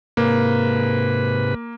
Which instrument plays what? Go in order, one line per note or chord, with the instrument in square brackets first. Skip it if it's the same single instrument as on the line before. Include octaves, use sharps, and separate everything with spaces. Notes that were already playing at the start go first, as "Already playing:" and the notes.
[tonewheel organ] G#2 C3 B4 [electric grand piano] A#3